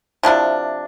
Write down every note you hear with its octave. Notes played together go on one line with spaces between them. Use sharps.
C3 F3 D4 E4